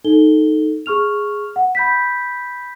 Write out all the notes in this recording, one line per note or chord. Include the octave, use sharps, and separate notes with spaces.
D#4 A4 G7
G#4 C#6 F6 F7
F#5
B5 G6 B6